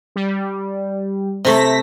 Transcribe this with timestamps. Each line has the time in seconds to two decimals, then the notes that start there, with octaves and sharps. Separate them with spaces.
0.16 G3
1.45 C3 A3 A4 A#6 B6